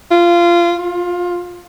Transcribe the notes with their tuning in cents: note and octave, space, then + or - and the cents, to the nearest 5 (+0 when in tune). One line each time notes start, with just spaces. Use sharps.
F4 -20
F4 +20